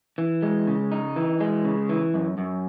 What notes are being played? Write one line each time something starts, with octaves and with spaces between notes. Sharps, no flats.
E3
G#3
C#3
D#4
E3
G#3
C#3
E3
F#2
F#2